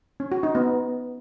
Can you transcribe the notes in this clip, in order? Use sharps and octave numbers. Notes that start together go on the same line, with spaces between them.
C#4
F#4
D#4
B3